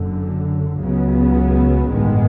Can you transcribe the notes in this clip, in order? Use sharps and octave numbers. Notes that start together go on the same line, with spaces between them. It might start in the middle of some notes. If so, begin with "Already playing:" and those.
Already playing: F#1 F#2 D3
C#2 C#3 F#3 B3
A1 G2 D#3 G#3 B3